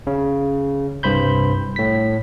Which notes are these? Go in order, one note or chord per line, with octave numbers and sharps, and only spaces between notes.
C#3
C2 G2 C5 B5 G6
A2 B6